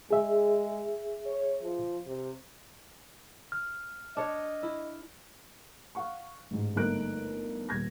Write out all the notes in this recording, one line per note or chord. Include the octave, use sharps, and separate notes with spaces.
G#3 G#4 E5
C#5
F3
C3
F6
D4 C#5 D#5
E4
F5 F#5 C#6
A1 G#2
G1 A3 A#3 D#4 F#6 D7
D#1 G#6 A#6